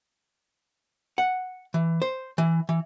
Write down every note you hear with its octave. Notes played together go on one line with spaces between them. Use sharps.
F#5
E3
C5
E3
E3